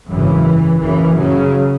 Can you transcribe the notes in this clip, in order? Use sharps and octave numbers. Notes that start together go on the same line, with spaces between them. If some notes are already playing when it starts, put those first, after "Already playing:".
G#1 F#2 C#3 E3
F#1 F#2 C#3 E3
C#3 F#3